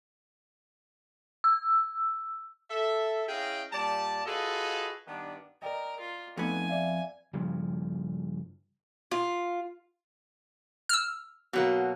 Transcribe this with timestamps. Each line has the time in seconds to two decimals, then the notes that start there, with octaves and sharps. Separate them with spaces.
1.44 E6
2.70 A4 E5
3.28 C#4 E4 G#4 D#5 F5 G5
3.72 A#2 G3 D5 A5
4.26 F4 F#4 G#4 A4 B4 D#5
5.07 G2 D#3 B3 D4
5.62 A#4 D5 D#5 G5
6.00 F4
6.37 F2 A3 B3 D#4 G#5
6.69 D5 E5 F5
7.33 G2 C#3 F3
9.11 F4
10.89 E6 F6
11.53 B2 F#3 A#3